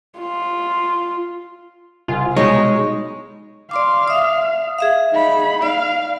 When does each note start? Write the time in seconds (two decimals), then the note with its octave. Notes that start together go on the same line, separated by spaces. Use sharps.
0.19 F4
2.08 C2 F4 G#5
2.37 B2 G3 G#3 D#4 C#5
3.71 D5 F5 C6 D6
4.08 E5 D#6
4.78 G#4 E5 F5
5.12 D#4 B5
5.62 D5 F5